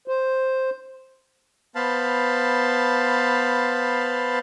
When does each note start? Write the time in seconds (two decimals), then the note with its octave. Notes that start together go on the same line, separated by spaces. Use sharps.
0.08 C5
1.75 B3 C5 F5 A5 B5